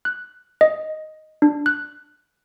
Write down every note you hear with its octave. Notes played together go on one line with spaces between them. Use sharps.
F#6
D#5
D4
F#6